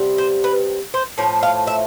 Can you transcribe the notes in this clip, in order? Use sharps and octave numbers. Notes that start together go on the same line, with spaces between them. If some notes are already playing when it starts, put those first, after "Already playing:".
Already playing: C3 G3 B3
C5
B4
C5
A2 F3 C#5
F5
E5